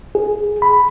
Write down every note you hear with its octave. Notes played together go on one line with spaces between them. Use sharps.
G#4
B5